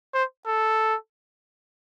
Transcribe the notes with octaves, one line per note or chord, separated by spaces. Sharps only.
C5
A4